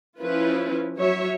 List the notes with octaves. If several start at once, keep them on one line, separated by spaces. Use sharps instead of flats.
F3 C#4 E4 F4 B4
F#3 C#5 E5